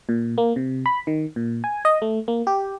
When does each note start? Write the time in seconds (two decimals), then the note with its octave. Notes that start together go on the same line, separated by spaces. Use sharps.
0.09 A#2
0.38 A#3
0.56 C3
0.86 B5
1.07 D#3
1.36 A#2
1.64 G#5
1.85 D#5
2.02 A3
2.28 A#3
2.47 G4